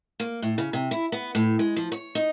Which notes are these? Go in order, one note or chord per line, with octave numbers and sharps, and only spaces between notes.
A#3
A2
C#3
C3
E4
B3
A2
G#3
F3
C#5
D#4